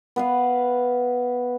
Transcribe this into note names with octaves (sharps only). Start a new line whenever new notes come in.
B3 B4 F5